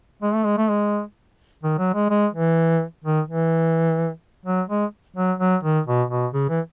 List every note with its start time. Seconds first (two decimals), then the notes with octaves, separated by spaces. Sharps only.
0.22 G#3
0.34 A3
0.45 G#3
0.57 A3
0.68 G#3
1.63 D#3
1.78 F#3
1.94 G#3
2.10 G#3
2.33 E3
3.04 D#3
3.28 E3
4.45 F#3
4.69 G#3
5.16 F#3
5.39 F#3
5.63 D#3
5.86 B2
6.10 B2
6.33 C#3
6.49 E3